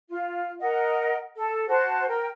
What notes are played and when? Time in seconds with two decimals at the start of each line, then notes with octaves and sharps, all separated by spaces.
0.08 F4
0.61 A#4 D#5 F#5
1.36 A4
1.68 F#4 C5 A5
2.08 A#4 G5